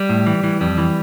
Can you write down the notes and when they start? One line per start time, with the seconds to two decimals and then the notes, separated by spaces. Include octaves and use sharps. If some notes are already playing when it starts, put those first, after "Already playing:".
Already playing: G3
0.09 A2
0.27 E3
0.44 E3
0.61 F2 G3
0.78 E3